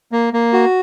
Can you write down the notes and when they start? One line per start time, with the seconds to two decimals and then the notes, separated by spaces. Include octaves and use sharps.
0.12 A#3
0.34 A#3
0.53 F#4